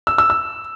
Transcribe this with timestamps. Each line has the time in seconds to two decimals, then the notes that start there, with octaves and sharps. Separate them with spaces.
0.07 E6
0.18 E6
0.30 E6